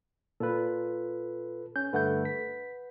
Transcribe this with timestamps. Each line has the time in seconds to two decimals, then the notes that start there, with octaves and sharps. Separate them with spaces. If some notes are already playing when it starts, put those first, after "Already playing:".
0.40 A#2 F4 A4 B4
1.76 C#4 G6
1.93 G2 D3 A3 B4 F#5 G6
2.25 B6